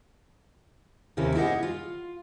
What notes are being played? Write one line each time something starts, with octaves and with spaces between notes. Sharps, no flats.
D#2 C3 A#3 C#4 E4
E4 G4 G#4 A#4 D#5 F#5
F4